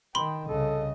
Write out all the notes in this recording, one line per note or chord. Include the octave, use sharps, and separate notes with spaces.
D#3 G5 B5 C6
C2 C#3 A4 D#5